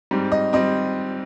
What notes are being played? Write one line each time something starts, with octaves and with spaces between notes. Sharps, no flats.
G#2 G3 C4
D#5
G3 C4 D#5